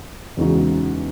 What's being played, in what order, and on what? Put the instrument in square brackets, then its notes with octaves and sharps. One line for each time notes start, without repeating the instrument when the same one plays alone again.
[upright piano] E2 C#3 G#3 D#4 F#4